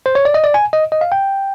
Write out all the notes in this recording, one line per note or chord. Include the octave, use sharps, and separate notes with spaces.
C5
C#5
D5
D#5
D5
G#5
D#5
D#5
F5
G5